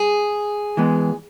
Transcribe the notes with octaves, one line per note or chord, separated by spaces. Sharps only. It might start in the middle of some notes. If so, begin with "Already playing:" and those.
Already playing: G#4
E3 G#3 B3